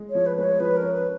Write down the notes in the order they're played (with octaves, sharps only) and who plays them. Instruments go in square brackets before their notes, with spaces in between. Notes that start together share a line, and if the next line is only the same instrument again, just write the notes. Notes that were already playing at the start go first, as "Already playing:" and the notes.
Already playing: [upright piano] G#3
[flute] C#5
[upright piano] F3
[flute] B4
[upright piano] G#3 [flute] B4
[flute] C#5
[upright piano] F3 [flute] B4
[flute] A#4
[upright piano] C#4
[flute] B4